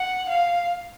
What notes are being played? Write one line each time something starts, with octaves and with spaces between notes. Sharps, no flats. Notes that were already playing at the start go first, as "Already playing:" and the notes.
Already playing: F#5
F5